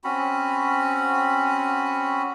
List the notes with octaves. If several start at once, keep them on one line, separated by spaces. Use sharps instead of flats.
C4 C#4 F#4 B5